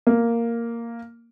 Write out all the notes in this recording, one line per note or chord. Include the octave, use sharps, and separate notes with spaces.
A#3